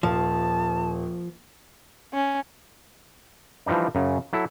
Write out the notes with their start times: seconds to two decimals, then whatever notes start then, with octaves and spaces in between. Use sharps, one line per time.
0.03 D#1 F3 A5
2.13 C#4
3.66 E3 F3 G3 D4 D#4
3.95 F#2 C#3
4.33 F#3 E4 A4